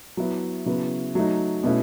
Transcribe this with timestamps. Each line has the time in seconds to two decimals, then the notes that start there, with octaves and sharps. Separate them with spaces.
0.17 F#3 B3 E4
0.66 C#3 F#3 B3 E4
1.15 F#3 A3 D#4
1.64 B2 A3 C#4 E4